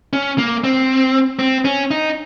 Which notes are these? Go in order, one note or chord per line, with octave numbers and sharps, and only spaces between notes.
C#4
A#3
C4
C4
C#4
D#4